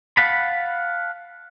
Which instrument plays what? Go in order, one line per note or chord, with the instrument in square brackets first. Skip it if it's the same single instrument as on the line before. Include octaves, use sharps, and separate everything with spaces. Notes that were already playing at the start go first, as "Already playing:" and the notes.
[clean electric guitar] F5 F#5 A5 B5